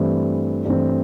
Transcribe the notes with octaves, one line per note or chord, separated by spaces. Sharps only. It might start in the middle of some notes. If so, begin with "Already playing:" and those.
Already playing: G2 E3 A3 C4
G2 E3 A3 C4